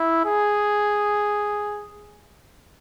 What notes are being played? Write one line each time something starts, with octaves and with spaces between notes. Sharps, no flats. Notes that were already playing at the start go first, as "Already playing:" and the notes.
Already playing: E4
G#4